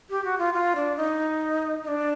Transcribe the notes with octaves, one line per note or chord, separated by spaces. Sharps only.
G4
F#4
F4
F4
D4
D#4
D#4
D4